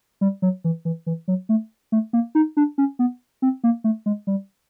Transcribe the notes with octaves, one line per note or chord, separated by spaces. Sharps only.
G3
F#3
E3
E3
E3
F#3
A3
A3
A#3
D#4
D4
C#4
B3
C4
A#3
A3
G#3
G3